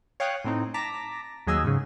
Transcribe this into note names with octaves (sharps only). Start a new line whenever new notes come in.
C#5 F5 G5 D#6 F#6
A2 C4 D#4
A5 A#5 D6 A#6 B6
D#2 F#3 G#4 D#5 G#5 E6
G#2 C#3